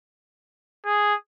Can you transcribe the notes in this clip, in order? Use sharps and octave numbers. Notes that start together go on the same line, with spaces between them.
G#4